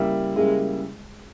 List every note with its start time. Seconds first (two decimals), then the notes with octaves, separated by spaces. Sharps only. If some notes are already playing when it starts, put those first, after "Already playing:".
Already playing: C#3 G3 A#3 E4
0.36 C#3 G3 G#3 A#3 E4